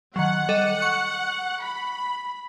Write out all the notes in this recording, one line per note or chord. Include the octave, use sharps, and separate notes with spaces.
D#3 F#3 F#5
G3 A4 D#5
C#6
B5